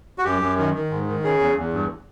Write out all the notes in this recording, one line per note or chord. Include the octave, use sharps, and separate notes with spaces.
F#4
F#2 G4
F#2
D#3
D#3
G#2
D#3
C#3 G#4
E2
E2
G2